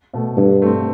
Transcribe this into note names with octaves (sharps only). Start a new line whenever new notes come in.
B2 A3
G2 D3
A3 C4